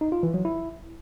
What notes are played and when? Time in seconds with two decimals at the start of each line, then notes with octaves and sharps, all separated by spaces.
0.01 D#4
0.12 F4
0.23 E3
0.34 F#3
0.45 E4